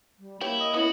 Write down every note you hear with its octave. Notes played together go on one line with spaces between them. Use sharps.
G3
A#3 E4 G4 C#5
D#5
B3 C#4 E4 F#4